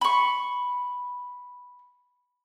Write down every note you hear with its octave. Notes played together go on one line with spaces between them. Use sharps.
B5 C#6